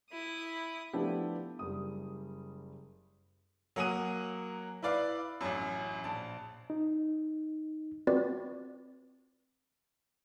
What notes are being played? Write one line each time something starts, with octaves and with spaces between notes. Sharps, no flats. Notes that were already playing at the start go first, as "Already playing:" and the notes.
E4 D#6
F3 A3 B3 D4 E4 G4
F#1 G3 D#6
F#3 A#3 F#5 G#5 D#6 D#7
E4 B4 D5 F5
A1 F#2
A#1 A5
D#4
C4 F4 F#4 B4 D5